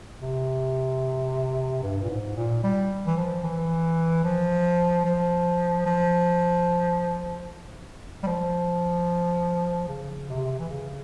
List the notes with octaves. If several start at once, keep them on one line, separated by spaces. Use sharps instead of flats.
C3
G2
A#2
G#2
A#2
G3
E3
F3
E3
F3
F3
F3
G3
F3
C#3
C3
E3
C#3